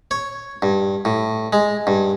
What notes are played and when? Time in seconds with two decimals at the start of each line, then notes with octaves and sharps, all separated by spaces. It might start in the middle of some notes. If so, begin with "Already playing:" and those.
0.11 C#5
0.62 G2
1.05 A2
1.53 G#3
1.87 G2